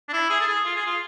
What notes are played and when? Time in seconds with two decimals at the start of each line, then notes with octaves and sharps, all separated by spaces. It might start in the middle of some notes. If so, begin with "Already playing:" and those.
0.08 D4
0.13 E4
0.30 G#4
0.41 A4
0.48 G#4
0.65 F4
0.76 G#4
0.86 F4